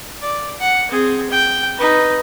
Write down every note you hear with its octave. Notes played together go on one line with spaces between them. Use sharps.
D5
F#5
C4 G#4
G5
D#4 B4